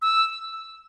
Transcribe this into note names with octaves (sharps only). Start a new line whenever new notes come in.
E6